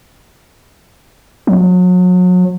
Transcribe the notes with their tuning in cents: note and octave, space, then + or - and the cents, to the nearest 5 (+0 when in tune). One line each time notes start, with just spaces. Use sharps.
F#3 -35